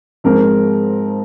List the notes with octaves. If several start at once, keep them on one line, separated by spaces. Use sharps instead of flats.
G#2 F3 G#3 C4 A#4